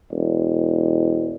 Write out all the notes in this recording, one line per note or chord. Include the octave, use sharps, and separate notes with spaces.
E1